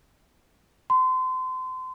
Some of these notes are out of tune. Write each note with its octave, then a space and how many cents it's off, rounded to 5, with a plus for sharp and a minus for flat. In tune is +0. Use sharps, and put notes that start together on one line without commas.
C6 -30